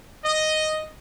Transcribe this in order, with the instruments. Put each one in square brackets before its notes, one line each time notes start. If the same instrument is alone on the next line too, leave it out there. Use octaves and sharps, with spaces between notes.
[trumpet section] D#5